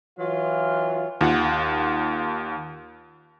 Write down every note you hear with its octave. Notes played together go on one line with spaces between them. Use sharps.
E3 F#3 F4
D#2 F4 F#5